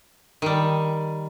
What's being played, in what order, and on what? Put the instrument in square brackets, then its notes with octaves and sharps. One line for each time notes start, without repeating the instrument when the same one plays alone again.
[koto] D#3 G3